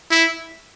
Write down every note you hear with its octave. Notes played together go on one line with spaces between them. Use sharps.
E4